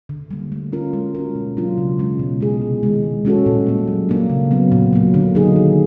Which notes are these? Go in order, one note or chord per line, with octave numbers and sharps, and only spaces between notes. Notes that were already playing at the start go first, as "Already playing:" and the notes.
D3
G3 A#3
A3
C#4 F4 A#4
G#3
C#4 F#4 A#4
B2
F#3 A#3 D4 F4
C#3
E3 G#3 C#4
B2
G#3 B3 E4 G#4
C3
D#3 G#3
B2
G#3 C#4 F#4 A4
A#2
G3 A#3
F#3
A#3 D4
C#3
F#3 B3
A#2
F#3 A#3
D3
F#3 A#3 D#4 G#4
D#3